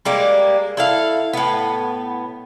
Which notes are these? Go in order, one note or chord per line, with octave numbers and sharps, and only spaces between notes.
G3 G#3 A#3
E4 A4 F5
A2 B3